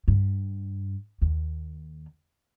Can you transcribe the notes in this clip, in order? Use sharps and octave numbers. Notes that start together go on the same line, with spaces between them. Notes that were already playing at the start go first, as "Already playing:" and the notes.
G2
D#2